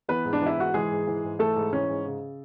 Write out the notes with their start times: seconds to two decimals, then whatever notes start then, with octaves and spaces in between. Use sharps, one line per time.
0.08 E3 B3 B4
0.25 G#2
0.33 D4
0.41 E3 E4
0.57 G#2 F#4
0.74 E3 G#3 G#4
0.91 G#2
1.07 E3
1.24 G#2
1.39 E3 A3 A4
1.56 G#2
1.73 E3 C#4
1.90 G#2
2.06 C#3